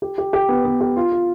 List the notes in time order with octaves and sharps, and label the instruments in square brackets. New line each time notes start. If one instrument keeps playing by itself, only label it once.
[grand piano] G4
G4
G4
B3
B3
G4
F4
F4